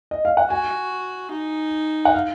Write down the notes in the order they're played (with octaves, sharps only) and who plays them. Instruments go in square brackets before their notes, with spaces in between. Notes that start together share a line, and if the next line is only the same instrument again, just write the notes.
[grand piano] D#5
F5
F#5
[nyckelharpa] F#4 [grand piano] G#5
[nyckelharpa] D#4
[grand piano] F#5
F5